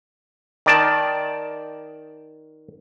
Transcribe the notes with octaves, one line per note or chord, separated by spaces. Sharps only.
D#3 D5 A5